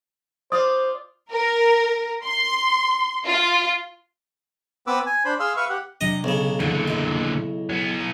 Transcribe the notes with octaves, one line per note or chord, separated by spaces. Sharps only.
F4 C5 D5 D#6
A#4
C6
F4
B3 C4 B4 D6 E6
G#5
D4 C5 B5
G#4 F5 C6 E6
B4 E5 F5 C#6
G4 F#5
C3 F#3 D4 D#5
B1 C#3
A#2 D3 E3
E4 D#5
F#3 B3